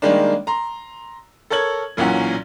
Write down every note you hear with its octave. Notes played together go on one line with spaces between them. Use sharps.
D#3 G3 G#3 A#3 D4
A#5 C6
A4 A#4 C#5 G#6 F#7
B1 A#2 E3 F#3 C#4 F#5